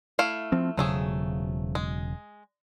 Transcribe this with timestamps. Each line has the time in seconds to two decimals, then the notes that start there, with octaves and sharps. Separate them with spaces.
0.19 A3 E4 F5
0.52 F3 C4
0.77 E1 C#3 F3 F#3 A3 G#4
1.75 G#3